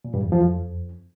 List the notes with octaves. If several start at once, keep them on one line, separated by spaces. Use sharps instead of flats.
A#2
G2
E2
F3
F2